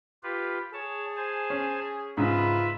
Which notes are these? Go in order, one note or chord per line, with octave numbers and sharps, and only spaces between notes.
F4 G4 B4
G#4 C#5 A5
C5 G#5 A5
C#4
G#2 C#3 F4 B4 E5 B5